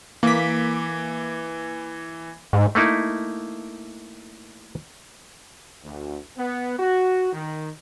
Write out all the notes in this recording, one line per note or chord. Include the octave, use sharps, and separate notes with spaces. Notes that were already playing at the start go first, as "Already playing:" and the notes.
E3 A#3 D6 B6
G#2
A3 A#3 D#4 E4
D2
B3
F#4
D#3